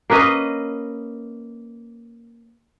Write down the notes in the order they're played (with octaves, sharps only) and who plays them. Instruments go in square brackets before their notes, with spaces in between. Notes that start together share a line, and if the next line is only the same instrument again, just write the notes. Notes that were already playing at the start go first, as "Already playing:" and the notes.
[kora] A#3 C#4 B4 D#5